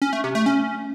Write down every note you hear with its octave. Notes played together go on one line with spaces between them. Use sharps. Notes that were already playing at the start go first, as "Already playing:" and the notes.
C#4
A3
C3
A3
C#4